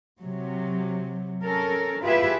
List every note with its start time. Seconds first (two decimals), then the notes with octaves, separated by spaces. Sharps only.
0.22 C3 F#3
1.43 C#4 A4 A#4
2.02 E4 F4 G4 G#4 B4 E5